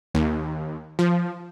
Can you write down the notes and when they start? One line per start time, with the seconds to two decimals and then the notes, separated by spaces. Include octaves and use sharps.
0.14 D#2
0.99 F3